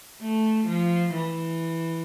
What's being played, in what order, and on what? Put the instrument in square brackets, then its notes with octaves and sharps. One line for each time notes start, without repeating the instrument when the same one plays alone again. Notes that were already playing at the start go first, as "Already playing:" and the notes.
[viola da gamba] A3
F3
E3